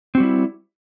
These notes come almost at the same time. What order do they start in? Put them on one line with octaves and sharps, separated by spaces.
C4 F#4 G3 E4